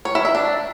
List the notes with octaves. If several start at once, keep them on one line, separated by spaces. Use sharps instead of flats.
C#5
E4
E5
D4